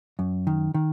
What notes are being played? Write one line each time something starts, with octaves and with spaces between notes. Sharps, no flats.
F#2
D#3
D#3